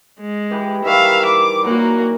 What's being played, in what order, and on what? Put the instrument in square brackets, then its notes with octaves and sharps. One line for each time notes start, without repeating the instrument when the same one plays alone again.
[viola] G#3
[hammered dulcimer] E3 G4 B4
[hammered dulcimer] D#3 E3 G3 [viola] E5 F5
[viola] D6
[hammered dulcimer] A#2 F#3 [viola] A#3 F#4